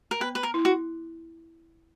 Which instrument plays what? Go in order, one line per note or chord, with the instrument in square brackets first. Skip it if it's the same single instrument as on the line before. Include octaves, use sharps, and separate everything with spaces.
[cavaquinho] A#4
[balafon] B3 [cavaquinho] B4
[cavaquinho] B4
A#4
[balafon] E4
[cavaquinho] F#4